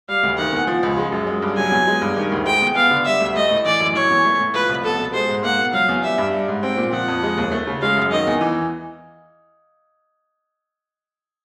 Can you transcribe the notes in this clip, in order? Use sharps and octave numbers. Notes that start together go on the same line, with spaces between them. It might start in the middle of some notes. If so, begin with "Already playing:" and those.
G3 F5
D2
D#3 F#5
E2
F3
C#2
G#3
F#2
G#3
G2
F#3 G#5
E2
G#3
G2
D#3
D2
G#3 G5
E2
B3 F5
D3
G3 E5
D2
A3 D#5
A2
E3 D5
F#2
E3 C#5
E2
A3
A2
F3 B4
C2
B3 A4
B2
G#3 C5
G#2
A#3 F#5
B2
F#3 F5
E2
G3 E5
G2
G3
G#2
C4 G5
A#2
F3 F#5
F2
G#3
D#2
A3
C#3
G#3 F5
F#2
D#3 D#5
E2
E3